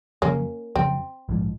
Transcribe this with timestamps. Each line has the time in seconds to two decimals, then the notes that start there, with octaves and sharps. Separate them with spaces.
0.22 F2 C#3 F#3 A#3 C#4
0.76 F2 C#3 F#3 C4
1.29 A#1 G#2 F3